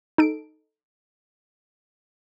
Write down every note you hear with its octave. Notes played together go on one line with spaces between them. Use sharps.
D#4 A4 D7